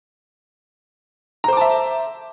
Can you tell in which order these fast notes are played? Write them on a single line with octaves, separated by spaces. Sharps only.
A#5 C5 D6 A5 E5